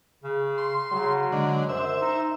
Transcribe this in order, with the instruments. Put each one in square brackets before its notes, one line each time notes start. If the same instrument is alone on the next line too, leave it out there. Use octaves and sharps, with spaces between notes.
[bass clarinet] C#3
[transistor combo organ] C6
[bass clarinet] C#3 [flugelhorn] F#3
[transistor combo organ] D3 [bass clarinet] G#3
[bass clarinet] F#2 [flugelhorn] C5 [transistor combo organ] E5
[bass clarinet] D#4